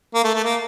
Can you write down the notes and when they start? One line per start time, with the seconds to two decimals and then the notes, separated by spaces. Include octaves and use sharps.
0.15 A#3
0.24 A3
0.34 A3
0.44 A#3